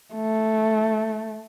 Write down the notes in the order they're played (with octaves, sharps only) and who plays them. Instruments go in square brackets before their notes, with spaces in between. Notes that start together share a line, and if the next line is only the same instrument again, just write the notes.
[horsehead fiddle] A3